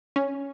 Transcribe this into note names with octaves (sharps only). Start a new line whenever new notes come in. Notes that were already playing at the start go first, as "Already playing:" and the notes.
C#4